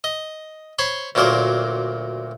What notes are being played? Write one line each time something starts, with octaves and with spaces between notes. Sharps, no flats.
D#5
C5 C#5 B5 C6
D2 A#2 F#3 A#4 C5 D5